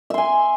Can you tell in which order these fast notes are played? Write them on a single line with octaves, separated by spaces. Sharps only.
E5 C6 G#5